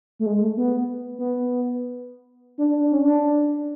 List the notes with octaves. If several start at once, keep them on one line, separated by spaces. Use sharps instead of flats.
A3
G#3
A3
B3
B3
D4
D4
D4
C#4
D4